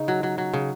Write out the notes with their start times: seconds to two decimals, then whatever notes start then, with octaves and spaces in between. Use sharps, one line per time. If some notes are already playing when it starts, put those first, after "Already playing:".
Already playing: C#3 D#4
0.08 F#3
0.23 F#3
0.38 F#3
0.54 C#3